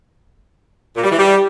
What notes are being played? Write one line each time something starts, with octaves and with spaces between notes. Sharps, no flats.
A#2
G3
E3
G3